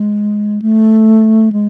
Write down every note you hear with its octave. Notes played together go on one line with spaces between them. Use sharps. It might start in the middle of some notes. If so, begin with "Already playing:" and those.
Already playing: G#3
A3
G#3